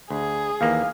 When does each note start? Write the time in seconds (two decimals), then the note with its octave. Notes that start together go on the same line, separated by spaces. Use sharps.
0.10 D2 G#4
0.61 D#2 E3 A#3 F5